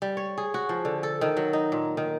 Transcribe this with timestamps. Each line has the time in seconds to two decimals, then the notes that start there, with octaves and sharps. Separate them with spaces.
0.02 G3
0.17 C#5
0.38 G#4
0.54 F#4
0.69 F3
0.85 D3
1.03 A4
1.21 D#3
1.37 F#3
1.53 D#4
1.72 A#2
1.97 D#3